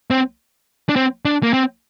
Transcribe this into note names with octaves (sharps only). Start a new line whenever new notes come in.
C4
D4
C4
D4
A#3
C4